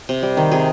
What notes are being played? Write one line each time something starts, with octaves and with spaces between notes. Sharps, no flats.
C3
G3
D#3
C3 G#4